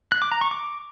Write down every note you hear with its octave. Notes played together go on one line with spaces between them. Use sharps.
F#6
D6
A#5
C#6
D6